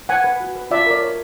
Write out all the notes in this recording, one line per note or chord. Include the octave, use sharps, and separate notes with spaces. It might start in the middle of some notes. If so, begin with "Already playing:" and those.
B4 F#5 G#5
B4
F#4
B4
F4 D5 E5
A#4 D5
C#5